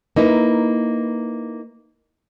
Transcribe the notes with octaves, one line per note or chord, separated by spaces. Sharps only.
A#3 D#4 E4 B4